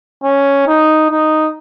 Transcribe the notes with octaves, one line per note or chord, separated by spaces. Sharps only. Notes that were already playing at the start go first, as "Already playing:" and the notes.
C#4
D#4
D#4